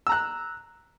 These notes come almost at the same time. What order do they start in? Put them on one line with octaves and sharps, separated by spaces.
E6 A#5 F#6